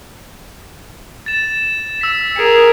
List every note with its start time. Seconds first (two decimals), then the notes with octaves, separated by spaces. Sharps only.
1.26 A6 E7
2.01 E6 B6
2.36 G#4 A#4 C#7